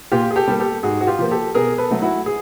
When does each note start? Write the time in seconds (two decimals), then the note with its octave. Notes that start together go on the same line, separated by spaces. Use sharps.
0.12 A#2 F4 G4
0.31 G#4
0.36 G4 A4
0.48 G3 A#3
0.59 G4 A4
0.83 G#2 F#4 G#4
1.01 F#4
1.07 F4 G4
1.19 F3 A#3
1.31 G4 A4
1.55 B2 G#4 A#4
1.78 A4 B4
1.91 F#3 A3
2.02 E4 F#4
2.26 G#4